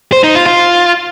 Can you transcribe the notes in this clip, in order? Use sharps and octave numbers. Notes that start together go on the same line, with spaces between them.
C5
D#4
F4
F4